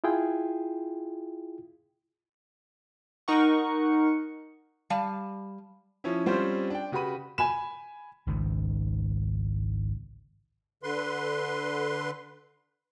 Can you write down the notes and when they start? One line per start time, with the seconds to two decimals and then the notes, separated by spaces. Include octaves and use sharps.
0.04 E4 F4 G#4 G5
3.28 D#4 A#4 F#5 C#6
4.90 G3 F5 A5
6.04 F3 C#4 E4
6.26 G3 C4 C#4 F4 C5
6.70 D4 G5
6.92 C#3 F#4 G4 B4 B5 D#7
7.38 G#5 B5 E7
8.27 G#1 C#2 G#2
10.83 D3 B4 C6